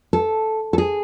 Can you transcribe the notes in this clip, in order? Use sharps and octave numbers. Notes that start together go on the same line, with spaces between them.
A4
A4
G#4